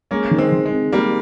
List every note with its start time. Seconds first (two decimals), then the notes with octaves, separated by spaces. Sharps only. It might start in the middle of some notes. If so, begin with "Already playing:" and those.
0.11 G#3 A#3 C#4
0.31 D#3
0.38 G#3 C4
0.52 D#3
0.66 G#3
0.72 C4
0.92 G3 G#3 A#3